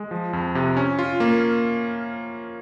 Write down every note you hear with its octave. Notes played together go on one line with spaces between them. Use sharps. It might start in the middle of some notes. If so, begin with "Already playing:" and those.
Already playing: G#3
F3
F2
C3
C#4
F4
A#3